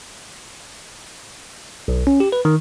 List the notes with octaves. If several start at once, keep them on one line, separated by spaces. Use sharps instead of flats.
B1
C#4
G4
B4
D#3